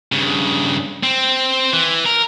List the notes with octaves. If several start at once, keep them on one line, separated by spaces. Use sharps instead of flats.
G2 C#3
C4
E3
A#4